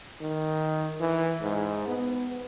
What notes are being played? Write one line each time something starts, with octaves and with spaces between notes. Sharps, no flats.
D#3
E3
G#2
B3